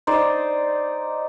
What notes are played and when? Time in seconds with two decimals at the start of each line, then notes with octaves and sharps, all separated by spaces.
0.07 D#4 C5 D5